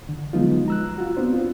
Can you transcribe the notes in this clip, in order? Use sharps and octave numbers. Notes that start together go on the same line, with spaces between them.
D3
F3 F#3 G#3 B3 D#4 F4
A#5 E6 F#6
F4 F#4
B3 C4 D4 C5
F4